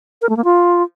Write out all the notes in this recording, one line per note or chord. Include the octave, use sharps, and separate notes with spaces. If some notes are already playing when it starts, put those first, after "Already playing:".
A#4
A3
A#3
F4